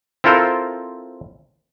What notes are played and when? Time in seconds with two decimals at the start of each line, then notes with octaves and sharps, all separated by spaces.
0.24 C4 E4 F4 A4 A#4 C5